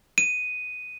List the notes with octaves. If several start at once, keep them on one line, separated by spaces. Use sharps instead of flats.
D#7